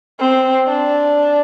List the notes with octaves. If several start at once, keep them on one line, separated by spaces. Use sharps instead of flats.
C4
D4